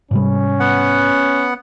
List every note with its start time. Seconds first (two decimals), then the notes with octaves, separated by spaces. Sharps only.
0.11 G#2 C3 G3 C#4
0.60 B3 F#5